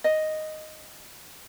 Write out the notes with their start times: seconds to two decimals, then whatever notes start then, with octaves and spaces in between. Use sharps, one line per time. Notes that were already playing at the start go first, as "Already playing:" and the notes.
0.04 D#5